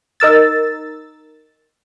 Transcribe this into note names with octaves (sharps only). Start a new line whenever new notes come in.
D#4 A#4 E6 A6